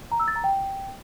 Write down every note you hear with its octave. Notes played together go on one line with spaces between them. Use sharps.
A#5
E6
A6
A#5
G5